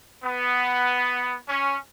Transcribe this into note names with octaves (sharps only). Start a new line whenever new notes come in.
B3
C#4